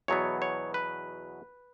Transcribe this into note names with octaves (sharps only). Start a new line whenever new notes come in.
E2 B2 F#3 B3 C#5
C#5
B4